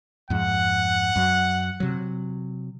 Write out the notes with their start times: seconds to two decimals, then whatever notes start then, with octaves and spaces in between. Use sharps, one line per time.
0.30 F2 G#2 F#5
1.16 F#2 F#3
1.80 C3 F#3